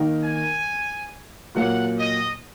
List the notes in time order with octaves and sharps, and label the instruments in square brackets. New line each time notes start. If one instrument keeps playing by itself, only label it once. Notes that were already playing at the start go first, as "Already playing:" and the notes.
Already playing: [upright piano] D#3 A#3 D#4 A#4
[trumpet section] G#5
[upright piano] A#2 F#3 A#3 [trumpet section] F#5
[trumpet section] D#5